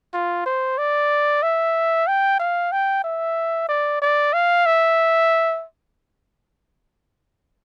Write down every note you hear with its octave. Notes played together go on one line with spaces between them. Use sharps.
F4
C5
D5
E5
G5
F5
G5
E5
D5
D5
F5
E5